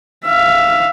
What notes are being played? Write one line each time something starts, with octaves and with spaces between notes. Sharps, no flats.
E5 F5